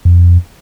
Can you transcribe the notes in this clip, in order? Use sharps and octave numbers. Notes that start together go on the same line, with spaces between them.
F2